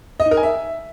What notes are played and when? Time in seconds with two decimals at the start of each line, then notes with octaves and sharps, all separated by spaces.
0.20 D#5
0.25 D#4
0.31 A#4
0.37 G#5
0.43 E5